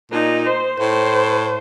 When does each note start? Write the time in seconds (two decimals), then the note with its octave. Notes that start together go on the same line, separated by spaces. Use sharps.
0.11 A#2 D#4
0.46 C5
0.80 A2 C5